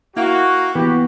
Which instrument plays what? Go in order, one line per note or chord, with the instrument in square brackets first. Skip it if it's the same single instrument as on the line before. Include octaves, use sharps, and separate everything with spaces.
[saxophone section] A#3 [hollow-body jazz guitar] E4 [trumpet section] F#4
[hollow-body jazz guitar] E3 B3 [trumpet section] F#4 G4